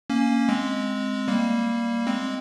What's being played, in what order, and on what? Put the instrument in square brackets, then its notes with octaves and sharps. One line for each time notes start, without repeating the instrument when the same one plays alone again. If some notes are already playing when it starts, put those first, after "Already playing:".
[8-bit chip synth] A#3 C#4
G#3 C4
G3 A#3
G#3 C4